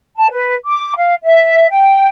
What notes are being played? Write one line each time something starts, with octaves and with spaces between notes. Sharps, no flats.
A5
B4
D6
F5
E5
G5